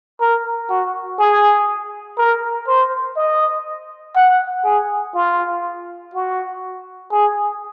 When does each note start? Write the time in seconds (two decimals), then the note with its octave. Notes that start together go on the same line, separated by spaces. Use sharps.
0.20 A#4
0.69 F#4
1.19 G#4
2.18 A#4
2.67 C5
3.16 D#5
4.16 F#5
4.65 G#4
5.15 F4
6.14 F#4
7.12 G#4